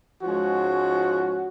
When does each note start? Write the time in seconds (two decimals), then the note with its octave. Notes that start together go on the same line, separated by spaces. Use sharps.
0.22 G#2 F3 G#3 C#4 F#4